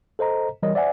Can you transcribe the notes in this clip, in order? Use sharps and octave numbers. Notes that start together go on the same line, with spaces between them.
A4 C5 D#5 A#5
E3 G3 A#4 C#5 D#5
C5 D5 E5 F#5 G#5